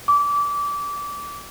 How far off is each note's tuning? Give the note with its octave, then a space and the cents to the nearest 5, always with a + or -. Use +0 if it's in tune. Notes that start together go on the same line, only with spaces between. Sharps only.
D6 -25